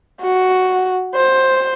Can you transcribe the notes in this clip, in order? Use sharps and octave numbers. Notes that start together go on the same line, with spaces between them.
F#4
C5